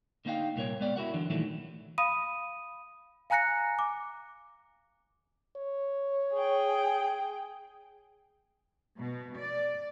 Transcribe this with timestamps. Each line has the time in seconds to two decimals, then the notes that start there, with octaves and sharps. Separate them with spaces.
0.25 D3 A#3 B3 D#4 F5 G5
0.56 C2 A#2 A#4 C#5
0.80 G#3 B3 D5 G5
0.96 E4 F#4 A#4 F#5
1.14 D3 E3 F#3 D4
1.30 A#2 D#3 E3 F#3 G3 A3
1.98 F5 B5 D#6 D#7
3.30 F5 G#5 A#5 F#6 A#6 C#7
3.79 D6
5.57 C#5
6.33 G#4 G5
9.00 B2
9.38 D5